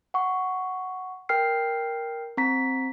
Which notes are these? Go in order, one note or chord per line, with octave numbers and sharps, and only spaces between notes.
F#5 C#6
A#4 G5 F6 C7
C4 A#5 B6